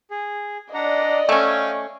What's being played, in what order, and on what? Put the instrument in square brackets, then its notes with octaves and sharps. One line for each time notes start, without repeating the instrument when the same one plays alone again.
[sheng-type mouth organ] G#4
[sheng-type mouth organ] D4 F#5 A#5 [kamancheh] D5 D#5
[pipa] A3 C#4 [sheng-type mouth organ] F5 G5 G#5